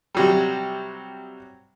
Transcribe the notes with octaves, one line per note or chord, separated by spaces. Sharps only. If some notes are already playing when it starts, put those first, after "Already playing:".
C3 F#3 G3